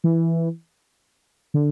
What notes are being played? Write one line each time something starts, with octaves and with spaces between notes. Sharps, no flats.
E3
D3